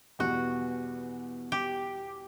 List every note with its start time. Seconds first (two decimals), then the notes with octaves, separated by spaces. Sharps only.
0.19 E2 B2 G3 F#4
1.52 G4